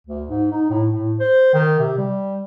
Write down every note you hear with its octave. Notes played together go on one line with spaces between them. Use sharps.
D2
G#2
D#4
A2
A2
C5
D#3
C3
G3